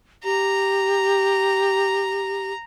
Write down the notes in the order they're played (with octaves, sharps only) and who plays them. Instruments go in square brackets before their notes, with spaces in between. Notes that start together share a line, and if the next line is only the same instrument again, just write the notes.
[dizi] G4 [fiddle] A#5